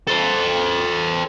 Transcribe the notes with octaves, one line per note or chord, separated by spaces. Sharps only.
A4 C5